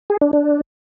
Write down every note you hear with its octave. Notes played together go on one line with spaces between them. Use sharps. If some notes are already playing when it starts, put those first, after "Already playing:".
G#4
D4
D4